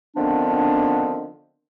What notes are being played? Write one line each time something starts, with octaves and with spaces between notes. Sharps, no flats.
D3 D#3 F3 B3 C4 D4